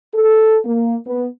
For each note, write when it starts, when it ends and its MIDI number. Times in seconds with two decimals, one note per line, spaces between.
0.14 0.58 69
0.65 0.95 58
1.07 1.26 59